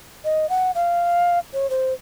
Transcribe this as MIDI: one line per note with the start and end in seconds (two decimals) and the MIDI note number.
0.25 0.49 75
0.50 0.71 78
0.75 1.39 77
1.53 1.69 73
1.70 1.93 72